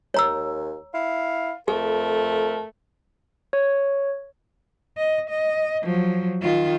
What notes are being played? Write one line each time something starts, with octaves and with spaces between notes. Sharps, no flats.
D#2 C#5 A#5 E6
E4 F5
F2 A3 G#4 A#4
C#5
D#5
D#5
F3 F#3
D#3 F4